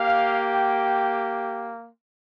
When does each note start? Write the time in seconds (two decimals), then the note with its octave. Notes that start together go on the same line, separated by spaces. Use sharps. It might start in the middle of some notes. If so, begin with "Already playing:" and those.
Already playing: A#3 G4 F5
0.51 G5